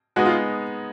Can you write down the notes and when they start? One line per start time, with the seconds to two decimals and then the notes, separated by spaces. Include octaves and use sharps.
0.16 G#3 B3 D#4 F#4
0.26 F4